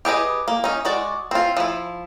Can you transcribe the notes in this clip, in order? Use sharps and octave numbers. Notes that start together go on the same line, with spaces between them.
G4 G#4 B4 D#5
A#3
C#4 D#4
G#3 F#4 D5
C4 F4
F3 E4